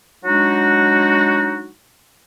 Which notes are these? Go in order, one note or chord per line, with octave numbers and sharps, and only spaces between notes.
F#3 G#3 D4 D#4 F#4